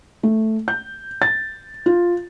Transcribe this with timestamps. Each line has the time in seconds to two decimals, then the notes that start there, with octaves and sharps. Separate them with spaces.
0.23 A3
0.68 G6
1.22 A6
1.86 F4